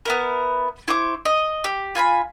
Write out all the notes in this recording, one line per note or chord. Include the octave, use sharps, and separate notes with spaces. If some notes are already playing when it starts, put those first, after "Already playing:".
B3 E4 A#4
E4 C5 C#6 D6
D#5
G4
F4 G#5 A#5 B5